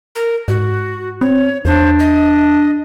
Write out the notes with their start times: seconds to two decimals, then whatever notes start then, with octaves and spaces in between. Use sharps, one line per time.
0.16 A#4
0.48 G#2 F#4
1.21 C4 C#5
1.65 E2 D4 C5
1.99 D#5